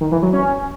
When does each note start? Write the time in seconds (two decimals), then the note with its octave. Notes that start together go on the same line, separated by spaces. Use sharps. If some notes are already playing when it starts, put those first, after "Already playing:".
0.01 D#3
0.12 E3
0.23 F#3
0.33 C#4